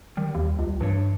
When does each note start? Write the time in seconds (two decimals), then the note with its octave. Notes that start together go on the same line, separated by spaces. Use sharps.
0.17 D#3 G3
0.35 D#2
0.59 C#2
0.81 G2 E3 D4 C#5